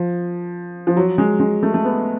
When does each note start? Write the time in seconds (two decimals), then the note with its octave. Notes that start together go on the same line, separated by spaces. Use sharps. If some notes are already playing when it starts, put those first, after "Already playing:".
Already playing: F3
0.87 F3
0.97 F#3
1.18 G#3
1.40 G#3
1.63 A3
1.74 A3
1.85 B3